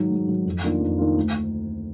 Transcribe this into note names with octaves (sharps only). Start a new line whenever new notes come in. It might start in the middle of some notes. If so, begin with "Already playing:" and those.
Already playing: G#2 D#3 F#3
G#2
D#3 F#3
F2
D#3 A#3 D4 F4
F2
D#3 A#3 D4 F4
D2